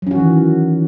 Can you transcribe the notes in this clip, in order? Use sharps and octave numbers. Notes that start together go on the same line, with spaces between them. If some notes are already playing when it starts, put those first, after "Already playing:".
D#3 E3 F#3 C#4 F#4